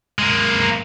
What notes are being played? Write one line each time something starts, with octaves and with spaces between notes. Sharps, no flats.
G#3 A#3